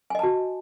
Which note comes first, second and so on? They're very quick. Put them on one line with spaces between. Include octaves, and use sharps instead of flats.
G#5 D#5 A5 F#4